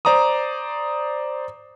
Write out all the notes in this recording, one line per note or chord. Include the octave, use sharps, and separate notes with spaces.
C5 D5 A#5 D6 D#6